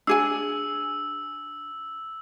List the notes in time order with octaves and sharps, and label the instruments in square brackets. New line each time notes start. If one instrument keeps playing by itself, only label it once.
[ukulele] D4 G#4 G#5 [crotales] E6